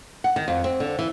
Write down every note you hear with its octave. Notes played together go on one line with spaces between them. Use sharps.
F#5
D#3
F2
C4
D3
E3